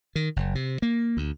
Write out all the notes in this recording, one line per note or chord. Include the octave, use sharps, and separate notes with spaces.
D#3
F#1
C3
A#3
D2